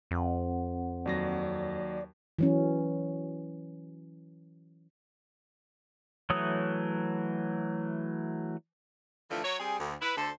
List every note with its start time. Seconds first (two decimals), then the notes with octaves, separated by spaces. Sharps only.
0.11 F2 C4 F#5
1.06 D#2 F#3 D5 A#6
2.39 E3 F#3 C#4
6.30 E3 F#3 A3 C#5 D#6
9.30 D3 E3 F3 A3
9.43 F#3 C#5
9.59 G3 C4 G#4
9.79 D2
10.01 E4 B4
10.16 D2 D3 A4 C5